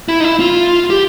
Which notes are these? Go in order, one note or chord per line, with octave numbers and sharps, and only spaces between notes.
E4
D#4
E4
F4
G4